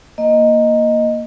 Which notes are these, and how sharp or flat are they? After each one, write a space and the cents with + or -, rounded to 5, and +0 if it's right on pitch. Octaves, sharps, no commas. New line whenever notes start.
A#3 +0 D#5 +0